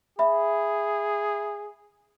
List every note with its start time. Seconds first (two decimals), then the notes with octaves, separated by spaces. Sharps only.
0.19 G#4 E5 B5